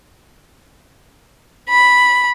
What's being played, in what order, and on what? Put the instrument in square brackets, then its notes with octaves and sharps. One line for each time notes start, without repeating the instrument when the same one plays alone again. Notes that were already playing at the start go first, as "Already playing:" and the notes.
[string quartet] B5